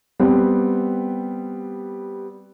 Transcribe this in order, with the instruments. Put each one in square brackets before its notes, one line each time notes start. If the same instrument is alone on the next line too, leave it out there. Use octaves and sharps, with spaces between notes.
[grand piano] G3 B3 C4